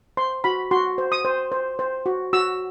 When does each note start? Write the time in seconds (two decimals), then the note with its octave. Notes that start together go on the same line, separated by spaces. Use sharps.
0.17 C5 C6
0.44 F#4 B5
0.71 F#4 C6
0.98 C5
1.12 D#6
1.25 C5
1.52 C5
1.79 C5
2.06 F#4
2.33 F#4 E6